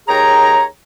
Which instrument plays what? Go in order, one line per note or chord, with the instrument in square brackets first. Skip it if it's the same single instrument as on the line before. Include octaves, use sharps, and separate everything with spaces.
[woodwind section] D#2 G#4 C#5 G5 A#5